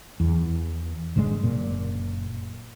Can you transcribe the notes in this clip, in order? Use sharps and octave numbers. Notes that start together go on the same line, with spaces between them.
E2
G#1 D3 D#3 G#3
F#1 A#2